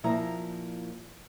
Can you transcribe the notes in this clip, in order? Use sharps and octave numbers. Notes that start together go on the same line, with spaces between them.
A#2 F3 E4 A#5